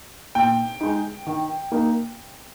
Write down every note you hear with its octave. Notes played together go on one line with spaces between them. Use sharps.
A#2 G5
G#3 D#4
D#3
A#3 D#4